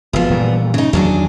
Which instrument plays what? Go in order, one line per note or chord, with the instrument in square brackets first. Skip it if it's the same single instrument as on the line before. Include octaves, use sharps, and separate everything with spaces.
[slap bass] F#1 [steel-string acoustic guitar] F3 B3
[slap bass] A#2 E3 G3
[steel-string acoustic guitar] C#3 D#4
[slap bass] E2 D#3 [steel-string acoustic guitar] F#3 D4 G#4